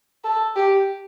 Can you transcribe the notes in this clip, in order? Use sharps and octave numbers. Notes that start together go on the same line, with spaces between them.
A4
G4